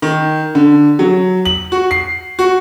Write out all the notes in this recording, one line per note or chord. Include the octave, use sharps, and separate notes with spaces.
D#3
D3
F#3
F#7
F#4
C7
F#4